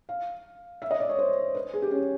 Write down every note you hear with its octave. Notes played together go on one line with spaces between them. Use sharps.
F5
E5
D#5
D5
C#5
C5
B4
G#4
G4
C#4